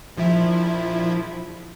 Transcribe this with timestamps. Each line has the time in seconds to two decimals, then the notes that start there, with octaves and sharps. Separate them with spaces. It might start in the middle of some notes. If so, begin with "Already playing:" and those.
0.17 A#1 F3 E4